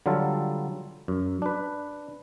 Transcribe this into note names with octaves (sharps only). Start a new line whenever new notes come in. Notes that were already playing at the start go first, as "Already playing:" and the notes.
D3 F#3 G3 F4 A4
F#2
D4 B4